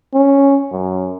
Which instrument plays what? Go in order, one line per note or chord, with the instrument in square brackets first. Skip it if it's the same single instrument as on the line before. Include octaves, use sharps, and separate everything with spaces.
[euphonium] C#4
F#2